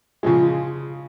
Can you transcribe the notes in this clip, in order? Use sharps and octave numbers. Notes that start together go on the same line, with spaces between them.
C#3 F3 G#3